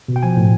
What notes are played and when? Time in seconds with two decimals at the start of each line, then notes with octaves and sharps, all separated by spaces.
0.08 B2
0.16 G5
0.23 F3 G#5
0.37 A2